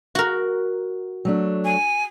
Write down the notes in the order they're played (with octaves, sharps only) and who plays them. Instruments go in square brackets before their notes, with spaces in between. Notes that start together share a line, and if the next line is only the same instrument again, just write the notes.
[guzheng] F#4 A#4
[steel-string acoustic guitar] F#3 A3 D4
[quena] G#5